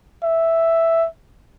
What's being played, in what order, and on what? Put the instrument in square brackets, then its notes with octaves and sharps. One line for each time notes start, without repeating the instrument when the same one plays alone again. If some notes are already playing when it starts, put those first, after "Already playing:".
[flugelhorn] E5